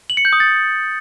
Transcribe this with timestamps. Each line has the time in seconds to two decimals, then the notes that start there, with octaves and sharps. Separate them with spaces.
0.10 F#7
0.17 C#7
0.25 G6
0.33 D#6
0.40 A6